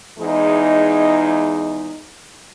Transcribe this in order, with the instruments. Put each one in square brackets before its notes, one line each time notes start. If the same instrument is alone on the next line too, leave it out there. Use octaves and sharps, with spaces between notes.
[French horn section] E2 E3 G#3 D#4